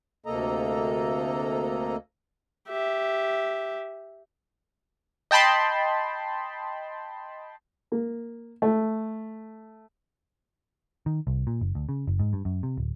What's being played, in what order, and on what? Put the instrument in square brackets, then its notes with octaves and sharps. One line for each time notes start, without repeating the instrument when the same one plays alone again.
[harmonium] D2 C3 A#3 A4 D#5 A#5
[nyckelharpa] G4 E5
[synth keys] D#5 G5 A5 B5 C6
[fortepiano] A#3
A3
[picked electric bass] D#3
C2
A#2
F#1
D2
C#3
F#1
G#2
G2
F#2
C3
D1